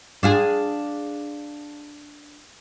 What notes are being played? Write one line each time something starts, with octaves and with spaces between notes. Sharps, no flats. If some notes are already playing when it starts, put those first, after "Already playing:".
D4 F4 G#4